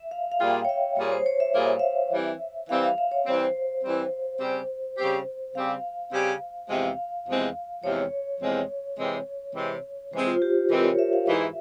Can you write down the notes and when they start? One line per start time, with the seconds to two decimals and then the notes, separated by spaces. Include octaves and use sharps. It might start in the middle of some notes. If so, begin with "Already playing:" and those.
Already playing: E5
0.11 F5
0.32 F5
0.40 A#2 G3 A#3 F4 G#4 G5
0.65 C#5
0.69 E5
0.97 A#2 G3 A#3 F4 G#4 C#5
1.12 C5
1.26 C#5
1.40 E5
1.54 A#2 G3 A#3 F4 G#4 E5
1.67 F5
1.79 E5
2.12 E3 G3 C4
2.69 E3 G3 C4 F5
2.83 F5
2.98 E5
3.11 C#5
3.26 E3 G3 C4 C5
3.84 E3 G3 C4
4.40 C#3 G3 C4 G4
4.98 C#3 G3 C4 G4
5.55 C#3 G3 C4 G4 F5
6.12 C#3 G3 C4 G4
6.69 E2 C3 F3 G#3 C4 F5
7.27 E2 C3 F3 G#3 C4
7.83 E2 C3 F3 G#3 C4 C#5
8.41 E2 C3 F3 G#3 C4
8.98 C3 E3 G#3 C4
9.55 C3 E3 G#3 C4
10.12 C3 E3 G#3 C4 C5
10.27 F4
10.42 G4
10.70 C3 E3 G#3 C4 A#4
10.84 C#5
10.99 E5
11.13 F5
11.27 G#2 E3 G#3 E4 E5